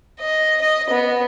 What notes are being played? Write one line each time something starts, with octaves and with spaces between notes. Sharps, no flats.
D#5
D#5
B3